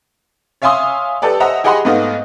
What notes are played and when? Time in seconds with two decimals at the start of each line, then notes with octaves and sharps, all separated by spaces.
0.62 C#5 E5 F5 G#5 C6 D#6
1.22 G4 A4 B4 D5
1.40 C5 D#5 E5 F#5 A#5
1.64 G4 G#4 D#5 F#5 B5 C6
1.85 G#2 A3 B3 D#5 F5